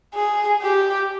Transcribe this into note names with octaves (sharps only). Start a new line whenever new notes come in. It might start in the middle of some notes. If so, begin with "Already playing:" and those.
G#4
G4